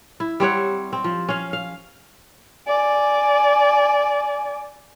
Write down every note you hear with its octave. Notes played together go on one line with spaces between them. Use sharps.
E4
G3 C4 C#5 F#5
C4
F3
C#4 F5
F5
D5 G#5